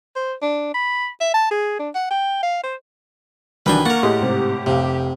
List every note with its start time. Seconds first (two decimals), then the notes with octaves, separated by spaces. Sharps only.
0.16 C5
0.42 D4
0.75 B5
1.21 E5
1.34 A5
1.51 G#4
1.79 D4
1.95 F#5
2.11 G5
2.43 F5
2.64 C5
3.66 C2 D#3 E3 F#3 D4 B4 G5 G#5
3.86 A#3 A#4 F#5 C#6 A6
4.03 A2 G4 G#4 D#5 C6
4.21 G#2 C3
4.66 F1 C3 F5